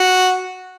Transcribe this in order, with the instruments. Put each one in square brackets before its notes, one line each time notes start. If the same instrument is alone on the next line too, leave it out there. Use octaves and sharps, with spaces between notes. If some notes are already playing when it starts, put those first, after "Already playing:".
Already playing: [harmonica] F#4